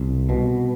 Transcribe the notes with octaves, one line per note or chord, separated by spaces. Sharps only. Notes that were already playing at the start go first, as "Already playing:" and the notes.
Already playing: C2
B2